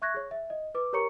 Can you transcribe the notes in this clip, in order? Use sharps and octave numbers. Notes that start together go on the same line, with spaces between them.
E5 C#6 F#6 G#6 A#6
G#4 C#5
E5
D#5
B4 D6
G4 A#4 C#5 A#5 C#6 C#7